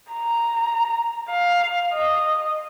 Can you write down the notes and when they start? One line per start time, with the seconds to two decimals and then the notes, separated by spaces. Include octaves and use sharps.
0.12 A#5
1.30 F5
1.93 D#5